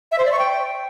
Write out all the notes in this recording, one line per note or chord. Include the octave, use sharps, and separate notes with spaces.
E5
C5
D5
C#6
G5